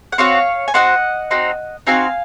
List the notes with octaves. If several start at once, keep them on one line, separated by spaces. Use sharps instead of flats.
F#5
C4 F#4 C#5 F5
G#5
C4 F#4 D#5 F#5
C4 D#4 F#4
C4 D#4 F#4 F5 G#5